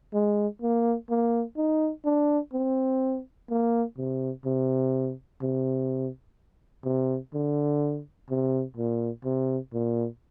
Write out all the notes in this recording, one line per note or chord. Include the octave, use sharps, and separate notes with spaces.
G#3
A#3
A#3
D#4
D4
C4
A#3
C3
C3
C3
C3
D3
C3
A#2
C3
A#2